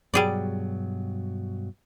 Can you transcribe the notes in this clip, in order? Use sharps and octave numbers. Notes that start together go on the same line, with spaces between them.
G2 B2 F#3 G3 G#4 D5